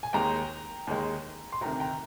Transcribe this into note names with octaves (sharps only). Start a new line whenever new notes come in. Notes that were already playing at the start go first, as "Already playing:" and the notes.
G#5
D#2 D#3 G#3 G5 A#5
D#2 D#3 G#3
C6
D2 C3 D#3 G5 A#5
G5 A#5